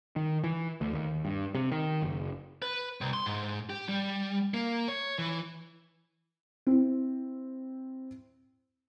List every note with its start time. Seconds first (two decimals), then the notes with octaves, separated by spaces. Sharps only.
0.16 D#3
0.44 E3
0.81 D2
0.93 D#2
1.25 G2
1.55 C3
1.71 D#3
2.02 F#1
2.62 B4
3.01 C2
3.13 C6
3.26 G#2
3.70 G4
3.89 G3
4.54 A#3
4.88 C#5
5.18 E3
6.67 C4 E4